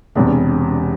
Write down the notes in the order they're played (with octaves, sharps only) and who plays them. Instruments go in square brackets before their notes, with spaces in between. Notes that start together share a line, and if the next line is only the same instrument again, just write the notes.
[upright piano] E1 E2 C3 D4